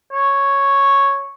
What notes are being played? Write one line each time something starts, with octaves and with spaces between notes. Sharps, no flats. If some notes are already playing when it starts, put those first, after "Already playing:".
C#5